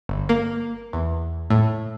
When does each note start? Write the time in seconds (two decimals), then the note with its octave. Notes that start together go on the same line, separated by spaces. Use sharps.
0.09 G1
0.29 A#3
0.93 E2
1.50 A2